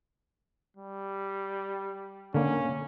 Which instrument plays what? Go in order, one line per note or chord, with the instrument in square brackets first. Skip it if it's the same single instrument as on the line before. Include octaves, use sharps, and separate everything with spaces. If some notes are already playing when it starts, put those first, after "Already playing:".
[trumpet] G3
[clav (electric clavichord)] D3 A#3 [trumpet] C#4